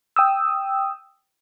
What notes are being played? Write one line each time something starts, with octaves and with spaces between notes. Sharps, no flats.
G5 D#6 E6